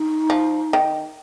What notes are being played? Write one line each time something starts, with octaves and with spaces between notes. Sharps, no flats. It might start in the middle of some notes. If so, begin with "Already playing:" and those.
Already playing: D#4
F3
D#3